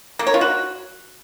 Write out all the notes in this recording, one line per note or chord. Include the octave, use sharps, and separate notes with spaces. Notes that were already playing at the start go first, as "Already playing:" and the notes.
A#3
C#5
F4
F#4